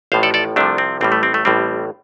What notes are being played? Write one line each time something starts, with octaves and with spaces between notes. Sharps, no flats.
A1 A2 F3 C5 F5
A4 D5
A4 D5
C2 C3 F3 A3 D4
C4
A1 A2 G3 C4
A3
C4
A3
A1 A2 G3 C4